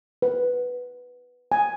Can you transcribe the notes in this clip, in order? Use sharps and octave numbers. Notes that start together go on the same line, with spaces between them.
B4
G#5